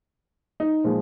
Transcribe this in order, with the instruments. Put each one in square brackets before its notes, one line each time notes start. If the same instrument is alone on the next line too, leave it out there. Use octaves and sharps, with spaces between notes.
[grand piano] D#4
A#2 F3 G#3